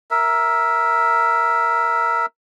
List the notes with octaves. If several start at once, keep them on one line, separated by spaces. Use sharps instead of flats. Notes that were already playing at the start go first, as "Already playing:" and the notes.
A#4 E5